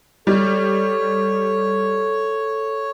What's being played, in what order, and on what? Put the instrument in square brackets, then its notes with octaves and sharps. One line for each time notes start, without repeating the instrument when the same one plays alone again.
[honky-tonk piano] G3 [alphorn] A4 [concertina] C#5